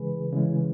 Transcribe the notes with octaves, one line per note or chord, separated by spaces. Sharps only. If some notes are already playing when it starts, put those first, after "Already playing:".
Already playing: C#3 E3 G#3 G#4 B4
C#3 E3 G#3